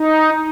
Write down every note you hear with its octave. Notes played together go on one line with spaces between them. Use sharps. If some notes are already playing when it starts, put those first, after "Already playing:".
Already playing: D#4